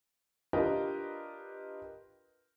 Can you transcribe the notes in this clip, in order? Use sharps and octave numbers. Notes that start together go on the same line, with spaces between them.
D4 F4 G4 A#4 B4 D#5